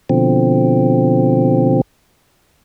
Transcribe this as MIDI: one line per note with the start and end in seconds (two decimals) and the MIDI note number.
0.10 1.81 47
0.10 1.81 50
0.10 1.81 53
0.10 1.81 60